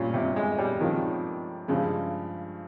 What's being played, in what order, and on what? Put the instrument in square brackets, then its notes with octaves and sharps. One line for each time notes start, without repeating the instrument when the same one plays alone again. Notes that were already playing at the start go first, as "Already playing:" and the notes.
Already playing: [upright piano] G2 G3 C#4 F4 [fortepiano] A#2
[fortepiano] C3
G#3
G3
[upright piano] C3 F3 G#3 C#4 F4 [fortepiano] D#3
[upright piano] G2 F3 G#3 [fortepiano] C#3